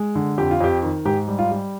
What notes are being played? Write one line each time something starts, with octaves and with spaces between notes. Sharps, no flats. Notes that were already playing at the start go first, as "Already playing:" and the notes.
Already playing: G#3
D3
F2 G4
F4
F2 G4
D#3
G#2 G4
G3
F4
G3